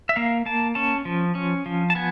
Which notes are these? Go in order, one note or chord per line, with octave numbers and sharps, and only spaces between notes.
E5
A#3 F5
A#3 A5
C#4 A5
F3
C#4
F3
A5
B3 G#5